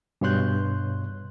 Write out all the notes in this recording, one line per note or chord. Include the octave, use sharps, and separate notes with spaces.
G2 B2 C#5 C6 F#6 G6